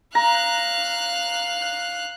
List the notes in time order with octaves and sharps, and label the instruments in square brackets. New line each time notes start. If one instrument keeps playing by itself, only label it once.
[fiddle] F5 F#6 [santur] A#5